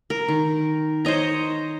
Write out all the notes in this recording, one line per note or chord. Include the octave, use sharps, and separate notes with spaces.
A#4
D#3
C5 C#5 D#5 A#5